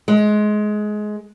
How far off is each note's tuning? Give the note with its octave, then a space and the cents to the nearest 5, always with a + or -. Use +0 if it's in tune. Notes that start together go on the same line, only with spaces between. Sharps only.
G#3 +20